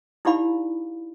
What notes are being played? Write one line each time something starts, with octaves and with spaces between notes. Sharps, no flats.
D#4 E4 G4 D5 F5 B5